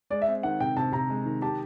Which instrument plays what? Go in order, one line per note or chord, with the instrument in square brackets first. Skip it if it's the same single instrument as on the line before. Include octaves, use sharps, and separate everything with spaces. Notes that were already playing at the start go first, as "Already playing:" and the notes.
[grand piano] G#3 [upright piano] D5
[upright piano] E5
[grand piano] C4
[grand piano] D#3 [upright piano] F#5
[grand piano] C3 [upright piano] G5
[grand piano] C3 [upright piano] A5
[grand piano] C3 [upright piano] A#5
[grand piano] G#3
D#3
[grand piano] G4 [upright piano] A5